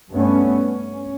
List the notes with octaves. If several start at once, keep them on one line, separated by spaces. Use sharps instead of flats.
G2 A3 B3 C#4
C#4